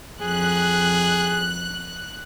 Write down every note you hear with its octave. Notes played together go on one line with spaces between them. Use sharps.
F2 G#4 F#6